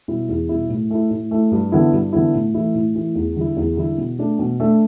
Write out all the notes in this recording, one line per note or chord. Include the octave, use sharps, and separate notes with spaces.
B2 G3 E4
E2
B2 G3 E4
A2
A3 E4
A2
A3 E4
G2
D3 B3 E4
G2
D3 B3 E4
A2
E3 A3 E4
A2
E3 A3 E4
E2
D3 G3 E4
E2
D3 G3 E4
B2
A3 D4
B2
A3 D4